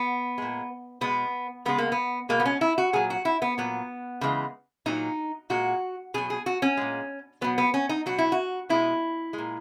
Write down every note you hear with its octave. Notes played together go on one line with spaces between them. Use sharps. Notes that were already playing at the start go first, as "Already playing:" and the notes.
Already playing: B3
A#2 G#3
B2 G#3 B3
C#3 G#3 B3
A#3
B3
B2 G#3 A#3
B3
C#4
E4
F#4
A#2 F#3 G#4
F#4
E4
B3
A#2 F#3 B3
C#3 E3 G#3
A#2 F#3 D#4
A#2 G#3 F#4
B2 F#3 G#4
G#4
F#4
C#4
A#2 G#3
B2 F#3 B3
B3
C#4
D#4
B2 F#3 F#4
E4
F#4
B2 G#3 E4
G#3
A#2